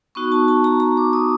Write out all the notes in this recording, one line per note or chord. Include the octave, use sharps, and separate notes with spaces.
B3 D#4 F#4 C#6
A5
A5
A#5
A#5
D6
D#6